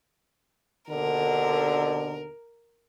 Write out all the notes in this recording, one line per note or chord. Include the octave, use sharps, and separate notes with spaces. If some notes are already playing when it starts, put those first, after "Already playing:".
D#2 B2 D3 A#4